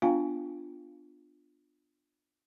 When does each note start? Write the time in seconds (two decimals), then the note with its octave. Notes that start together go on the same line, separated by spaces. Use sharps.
0.02 B3 D4 F4 F5 G5 G#5